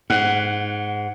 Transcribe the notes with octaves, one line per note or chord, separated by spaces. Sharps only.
G#2 F#5